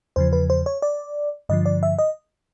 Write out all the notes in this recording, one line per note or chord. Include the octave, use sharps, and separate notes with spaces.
E2 C#3 F3 C5
B4
C5
C#5
D5
G2 D3 F3 D#5
D5
E5
D#5